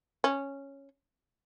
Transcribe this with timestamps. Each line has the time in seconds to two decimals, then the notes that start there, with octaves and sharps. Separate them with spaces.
0.24 C#4